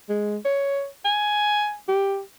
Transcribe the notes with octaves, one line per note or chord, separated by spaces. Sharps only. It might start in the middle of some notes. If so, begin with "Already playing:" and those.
G#3
C#5
G#5
G4